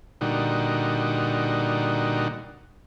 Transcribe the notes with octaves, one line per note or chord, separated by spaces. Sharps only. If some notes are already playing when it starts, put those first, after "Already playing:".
A#2 D3 G3 D#4 F#4